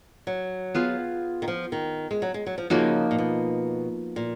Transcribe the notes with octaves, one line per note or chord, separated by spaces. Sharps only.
F#3
B3 F4 G#4 B4
D#3
F3
D#3
G#3
F#3
G#3
F#3
F3
C#3 F3 A#3 D#4 F#4
A#2
B2
A#2